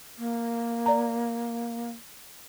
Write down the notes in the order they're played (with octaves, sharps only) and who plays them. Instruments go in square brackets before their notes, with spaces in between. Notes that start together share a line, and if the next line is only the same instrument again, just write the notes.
[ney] A#3
[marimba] D5 A#5